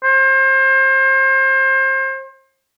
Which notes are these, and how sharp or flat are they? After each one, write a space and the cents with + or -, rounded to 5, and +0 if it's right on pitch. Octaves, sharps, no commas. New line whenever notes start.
C5 +30